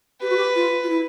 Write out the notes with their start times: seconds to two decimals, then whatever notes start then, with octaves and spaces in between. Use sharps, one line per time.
0.22 G4 B4
0.30 F#4
0.37 G4
0.56 F4
0.83 F4
0.90 E4